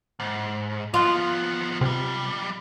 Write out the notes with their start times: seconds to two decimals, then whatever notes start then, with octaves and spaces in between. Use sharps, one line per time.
0.20 G#2
0.94 F3 B3 F4
1.81 B1 C3 G3